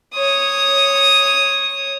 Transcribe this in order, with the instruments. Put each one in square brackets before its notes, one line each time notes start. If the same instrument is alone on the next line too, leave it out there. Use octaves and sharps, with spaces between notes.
[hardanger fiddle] C#5 D#6